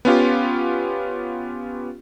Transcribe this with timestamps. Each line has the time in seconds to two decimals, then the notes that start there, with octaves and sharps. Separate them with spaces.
0.05 B3 C#4 F4 G4